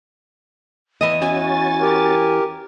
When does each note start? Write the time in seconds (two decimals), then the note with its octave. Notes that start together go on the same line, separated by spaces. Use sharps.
1.01 E2 E3 D#5
1.22 C#4 F#4 G#5 A6
1.81 G4 A#4